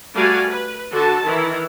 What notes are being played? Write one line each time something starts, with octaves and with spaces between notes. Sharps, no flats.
G3 A3 F#4 D5 F5 G#5
B4
D3 F#4 A4 A5
D#3 E3 E4